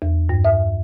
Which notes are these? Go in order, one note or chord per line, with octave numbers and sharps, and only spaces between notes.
E2
G2
E5